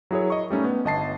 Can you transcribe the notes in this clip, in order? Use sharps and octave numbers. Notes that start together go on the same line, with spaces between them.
F#3 E4 G#4 A#4 C#5
D#5 C#6
G3 A3 C#4 D#4
B3
G1 D#5 A5 C7